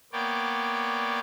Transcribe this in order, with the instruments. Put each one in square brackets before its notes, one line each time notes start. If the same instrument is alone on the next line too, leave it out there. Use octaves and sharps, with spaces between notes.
[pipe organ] A#3 B3 C#5 D5 G5